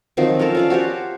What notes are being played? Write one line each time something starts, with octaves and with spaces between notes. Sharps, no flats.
D#3 F3 F#3 C4
C#4 A4 A#4 A5
C#4 F4 D5
F#4 G4 C5 C#5